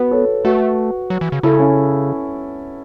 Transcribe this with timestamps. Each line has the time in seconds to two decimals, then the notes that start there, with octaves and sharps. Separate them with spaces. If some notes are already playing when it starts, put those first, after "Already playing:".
Already playing: B3 F#4 B4
0.11 A4 C#5
0.44 A3 F#4 B4
1.10 F#3
1.21 E3
1.32 C#3
1.43 C#3 E4 A4
1.60 C#4